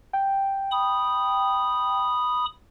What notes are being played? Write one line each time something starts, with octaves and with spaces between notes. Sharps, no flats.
G5
B5 D#6